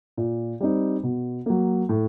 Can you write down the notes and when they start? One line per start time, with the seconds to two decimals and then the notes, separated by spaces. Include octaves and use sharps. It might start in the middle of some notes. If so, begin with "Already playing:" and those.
0.17 A#2
0.60 G3 C4 D#4
1.03 B2
1.46 F#3 A#3
1.89 A2